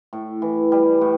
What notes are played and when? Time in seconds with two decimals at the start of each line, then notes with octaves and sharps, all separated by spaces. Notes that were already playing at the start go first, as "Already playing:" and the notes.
0.13 A2
0.42 E3
0.72 G3
1.01 A2